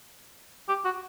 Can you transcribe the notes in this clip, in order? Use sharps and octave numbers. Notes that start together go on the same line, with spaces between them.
G4
F#4